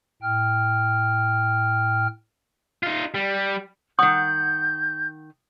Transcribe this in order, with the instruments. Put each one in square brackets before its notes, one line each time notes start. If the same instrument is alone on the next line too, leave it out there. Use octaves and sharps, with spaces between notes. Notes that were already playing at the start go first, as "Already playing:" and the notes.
[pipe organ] A2 G5 F6
[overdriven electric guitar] D#4 F4
G3
[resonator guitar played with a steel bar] D#3 F#5 [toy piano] D#6 [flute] G6